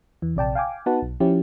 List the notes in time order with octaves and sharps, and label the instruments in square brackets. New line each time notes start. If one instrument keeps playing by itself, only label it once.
[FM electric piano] E2 E3
A#1 C3 D5 G5 A5
F5 G5 G#5 D6
B3 D#4 F#4 B4 F#5 A5
B1
F3 C#4 E4 G4